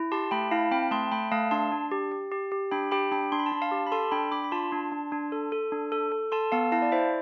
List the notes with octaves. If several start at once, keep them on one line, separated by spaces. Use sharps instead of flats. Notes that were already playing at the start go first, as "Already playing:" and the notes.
Already playing: E4
G4 A5 C6
A3 G5 B5
E4 F5 A5
C4 G5 B5
A3 A5 C6
A3 G5 B5
A3 F5 A5
D4 A5 C6
D4
G4
G4
G4
G4
D4 G5 B5
G4 G5 B5
D4 G5 B5
D4 C6
B5
A5 C6
D4
F5 A5
G4
B5
A4 A5 C6
D4 G5 B5
D4 B5 D6
B5
F4 A5 C6
D4
D4
D4
A4
A4
D4
A4
A4
A4 A5 C6
B3 F5 A5
E4 F5 A5
D5
E4 C5 E5